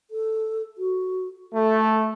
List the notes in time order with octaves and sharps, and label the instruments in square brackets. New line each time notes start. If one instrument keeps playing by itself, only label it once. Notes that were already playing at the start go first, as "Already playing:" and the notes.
[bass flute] A4
F#4
[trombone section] A3 [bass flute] A4